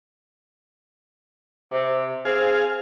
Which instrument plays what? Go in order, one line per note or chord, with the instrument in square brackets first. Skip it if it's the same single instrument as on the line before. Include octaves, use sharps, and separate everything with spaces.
[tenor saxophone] C3
[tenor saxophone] C4 [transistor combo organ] G#4 F5